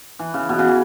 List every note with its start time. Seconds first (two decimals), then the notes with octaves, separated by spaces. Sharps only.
0.19 E3
0.34 C#3
0.49 B2
0.59 C#3
0.68 E3